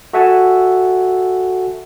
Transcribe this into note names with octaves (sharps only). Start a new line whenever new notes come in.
F#4 A4 E5 F#5 G#5 A5